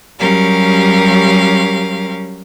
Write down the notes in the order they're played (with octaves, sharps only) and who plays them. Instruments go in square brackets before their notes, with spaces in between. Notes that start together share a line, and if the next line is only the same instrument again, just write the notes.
[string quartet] F#3 G3 C#4 G4 A#4 F5